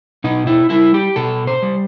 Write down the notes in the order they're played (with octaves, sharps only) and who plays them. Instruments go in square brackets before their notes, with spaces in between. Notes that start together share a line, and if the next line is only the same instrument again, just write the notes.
[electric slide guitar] B2 D#4
E4
G3 E4
G4
B2 A4
C5
G3